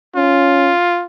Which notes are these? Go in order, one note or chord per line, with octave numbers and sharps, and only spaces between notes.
C#4 F4